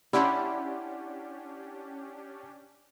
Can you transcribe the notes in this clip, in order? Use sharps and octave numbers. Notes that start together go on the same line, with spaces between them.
C#4 D4 E4 G4 D5 F#5 C6